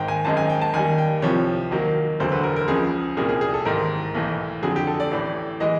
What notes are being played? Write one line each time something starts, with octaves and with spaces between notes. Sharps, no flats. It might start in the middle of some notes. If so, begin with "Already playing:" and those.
Already playing: G#1 G#2 D#3 G5
G#5
G#1 F#2 D#3 G#3 A5
G#5
G5
A5
D#2 D#3 G3 G#5
G5
C2 C3 F3 C#5
D#2 D#3 F#3 A#3
E1 D2 D3 F#3 C5
B4
A#4
A#4
C#2 C#3 F3 G#4
C2 A#2 G3 A#3 G#4
G#4
G#4
A4
A1 G#2 D#3 A#4
B1 A2 E3
F2 D3 F#3 G#4
G4
A4
D5
A1 A2 E3
E3 G#3 D#5